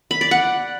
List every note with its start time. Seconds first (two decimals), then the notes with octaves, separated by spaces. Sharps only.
0.11 B5
0.21 D5
0.31 F#5